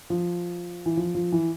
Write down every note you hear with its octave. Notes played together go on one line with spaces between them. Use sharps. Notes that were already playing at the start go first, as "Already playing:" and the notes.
F3
E3
F3
F3
E3